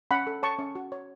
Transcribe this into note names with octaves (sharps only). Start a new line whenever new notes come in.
C#4 F#5 B5
A4
C#5 A5 C#6
C#4
F#4
C#5